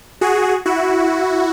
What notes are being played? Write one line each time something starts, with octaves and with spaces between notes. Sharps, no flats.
F#4 G#4
E4 F#4